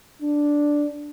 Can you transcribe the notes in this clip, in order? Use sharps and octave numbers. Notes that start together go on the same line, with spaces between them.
D4